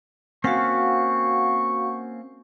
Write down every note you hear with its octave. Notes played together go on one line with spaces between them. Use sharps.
A#3 C4 C#4 F#4 F5 F#5 C#6